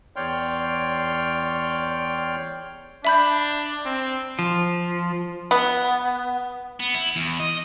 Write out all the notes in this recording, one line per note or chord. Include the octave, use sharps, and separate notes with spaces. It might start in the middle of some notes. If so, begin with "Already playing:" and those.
E2 C#5 D5 G5 C6 F6
D4 E5 B5 G6
C4
F3
B3
B3
E4
E2
D#5